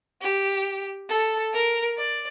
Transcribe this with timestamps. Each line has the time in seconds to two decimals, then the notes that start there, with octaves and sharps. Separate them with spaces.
0.22 G4
1.09 A4
1.54 A#4
1.97 D5